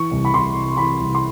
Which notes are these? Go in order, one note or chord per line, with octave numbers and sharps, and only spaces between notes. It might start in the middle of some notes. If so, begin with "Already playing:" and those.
Already playing: E3 C#6
C2
B5
C2 C6
C3
E3 B5
C2
C6